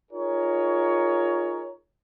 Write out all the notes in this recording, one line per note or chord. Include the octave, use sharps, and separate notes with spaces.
D#4 F4 G#4 A#4 C#5